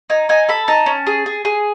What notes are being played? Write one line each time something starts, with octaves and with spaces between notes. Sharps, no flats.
D#4 G#5
D#4 G#5
A4 B5
D#4 A5
C#4
G#4
G#4
G#4